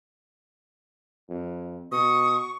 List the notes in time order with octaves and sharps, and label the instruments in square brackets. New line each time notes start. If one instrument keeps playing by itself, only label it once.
[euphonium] F2
[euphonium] B2 [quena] C#6 [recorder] D#6